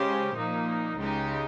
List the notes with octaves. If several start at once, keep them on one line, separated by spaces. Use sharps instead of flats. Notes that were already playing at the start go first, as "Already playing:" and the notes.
Already playing: C#3 G#3 C#4 G4 C5
A#2 F3 A#3 D#4
C#2 C#3 G#3 D#4 G4